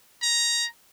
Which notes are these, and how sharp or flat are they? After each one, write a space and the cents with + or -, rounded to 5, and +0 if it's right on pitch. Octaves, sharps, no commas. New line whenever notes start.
A#5 +10